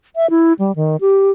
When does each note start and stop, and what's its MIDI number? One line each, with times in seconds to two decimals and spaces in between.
0.16 0.30 76
0.30 0.53 64
0.59 0.75 55
0.76 0.97 51
1.01 1.31 67